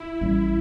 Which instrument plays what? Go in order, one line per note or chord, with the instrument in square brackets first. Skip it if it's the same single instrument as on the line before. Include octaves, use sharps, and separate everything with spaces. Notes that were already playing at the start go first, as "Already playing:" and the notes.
Already playing: [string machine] E4
[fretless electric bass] A1 A2 G3